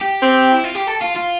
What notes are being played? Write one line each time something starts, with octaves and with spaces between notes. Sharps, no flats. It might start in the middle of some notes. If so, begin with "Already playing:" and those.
G4
C4
E4
F4
G4
A4
F4
F4